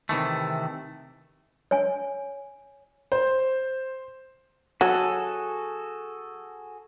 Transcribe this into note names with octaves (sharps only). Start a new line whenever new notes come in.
C3 D#3 E3 A3
C#5 G#5
C5
F#3 F#4 G#4 A4